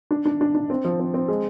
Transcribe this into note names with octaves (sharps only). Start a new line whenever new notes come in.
D4
D4
D4
D4
C4
F3
C4
C4
G#3